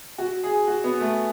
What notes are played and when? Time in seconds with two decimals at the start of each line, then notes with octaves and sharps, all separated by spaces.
0.18 F#4
0.43 G#4
0.68 F#4
0.84 B3
1.00 A3